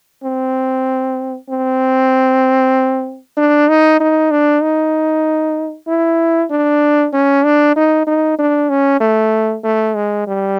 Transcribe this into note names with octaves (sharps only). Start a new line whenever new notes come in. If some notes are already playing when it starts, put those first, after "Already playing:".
C4
C4
D4
D#4
D#4
D4
D#4
E4
D4
C#4
D4
D#4
D#4
D4
C#4
A3
A3
G#3
G3